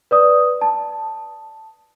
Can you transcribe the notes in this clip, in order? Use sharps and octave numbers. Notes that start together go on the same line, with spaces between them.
B4 D5 D#6
A5